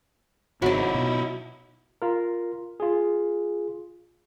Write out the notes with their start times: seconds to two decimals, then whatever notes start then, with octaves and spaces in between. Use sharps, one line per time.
0.62 G#1 C#3 F#3 C4 D#4 E4 D5
0.94 B2
2.02 F4 A#4
2.80 F4 G#4